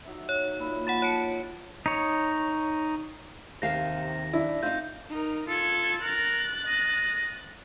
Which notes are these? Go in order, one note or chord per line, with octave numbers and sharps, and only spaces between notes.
F#3 D#4 E5
C#5
A#2 D#4 E4
F3 F#5 B5 A6
C#5 A5 C#7
D#4 C#5
D#2 C3 D#3 F5 A#6
D4 E4
C4 D#4 F4 G6
D#4 A#4
F4 A4 G#6
A#4 F#6 A6
D#5